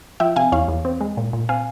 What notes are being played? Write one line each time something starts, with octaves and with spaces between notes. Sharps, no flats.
F3 E5 G5
C3 F5 G#5
E2 C#5 F5
E2
C4
G#3
A#2
A#2
C4 F5 G#5